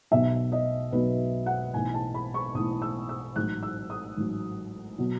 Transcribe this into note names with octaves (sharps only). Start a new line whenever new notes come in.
B1 B2 F#3 E5
D#5
B1 B2 F#3 B4
F#5
B1 A2 E3 G#5
A5
B5
C#6
B1 A2 E3 D#6
E6
E6
A1 G#2 F#3 F#6
E6
D#6
A1 G#2 F#3
B2 F#3